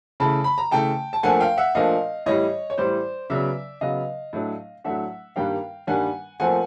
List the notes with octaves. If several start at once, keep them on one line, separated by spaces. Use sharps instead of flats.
C#3 E3 A3 A5 B5
B5
A#5
C#3 E3 A3 G5 A5
A5
A#2 F3 A3 D4 F#5 G#5
F5 G5
E5 F#5
A#2 F3 A3 D4 D#5 F5
A2 E3 G3 C#5 D#5
C#5
A2 E3 G3 C5 D5
C#3 F#3 B3 D5 E5
C#3 F#3 B3 D#5 F5
A2 F#3 A3 D4
A2 F#3 A3 D4 E5 F#5
G2 D#3 G3 A#3 D4 F5 G5
G2 D#3 G3 A#3 D4 F#5 G#5
A#2 F3 A3 C4 F#5 G#5